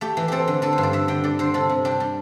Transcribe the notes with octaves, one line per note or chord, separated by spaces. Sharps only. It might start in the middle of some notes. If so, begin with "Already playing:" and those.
A3 G4
E3
C4 G4 A4
D3
D3 A4
C5
G2
D5
D3 E5
D3 G5
D3 D5
D3 C5
C3 A4
C3
D4 G4
G3